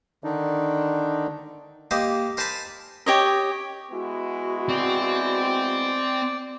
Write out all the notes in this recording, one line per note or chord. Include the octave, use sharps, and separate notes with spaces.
D3 D#3 D4 D#4
A#3 G4 C5 D#5
A#4 C5 G#5 A5 B5 C6
G4 C#5 D#5
G#3 B3 E4 F#4
C4 D5